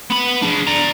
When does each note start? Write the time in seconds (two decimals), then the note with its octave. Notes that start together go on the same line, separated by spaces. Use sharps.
0.10 B3 B5
0.42 D4 G#4
0.67 D5 A#5